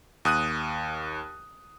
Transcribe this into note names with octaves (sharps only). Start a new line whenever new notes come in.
D#2 D#6 F#6 D#7